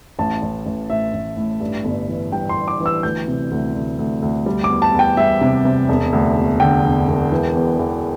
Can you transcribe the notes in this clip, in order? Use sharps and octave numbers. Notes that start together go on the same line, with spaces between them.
A1 A5
A1
A1
A2 E5
A1
A2
G2
G1
E3
G3 G5
C6
G2
D6
E3
E6
D2 G6
C3
D2
D2
D2
D2
G3
D6
E2
A5
E2
G5
G3 E5
C3
C3
E1
D2
E1
D3 G5
E1
E1
E3
E2
E2